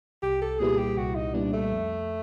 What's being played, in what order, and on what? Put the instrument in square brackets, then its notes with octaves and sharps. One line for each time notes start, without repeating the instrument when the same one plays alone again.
[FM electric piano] C2 [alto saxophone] G4
[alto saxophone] A4
[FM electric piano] A#2 G3 B3 E4 [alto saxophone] G#4
[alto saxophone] G4
[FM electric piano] C2 [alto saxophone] F#4
[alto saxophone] D#4
[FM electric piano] A#2 G3 B3 E4 [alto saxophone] D4
[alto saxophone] A3
[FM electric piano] F2